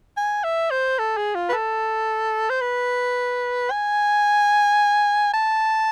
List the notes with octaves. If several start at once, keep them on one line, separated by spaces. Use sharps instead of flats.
G#5
E5
C5
A4
G#4
F4
B4
A4
C5
B4
G#5
A5